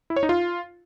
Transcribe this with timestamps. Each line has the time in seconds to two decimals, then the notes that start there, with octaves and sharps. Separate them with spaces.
0.10 E4
0.16 C#5
0.23 D#4
0.29 F4